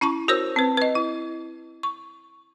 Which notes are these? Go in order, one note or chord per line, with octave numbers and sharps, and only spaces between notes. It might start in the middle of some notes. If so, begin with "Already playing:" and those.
C#4 E4 A5 C#6
F#4 A#4 C5 C#5 E6
C4 B4
B4 D#5
E4
C#6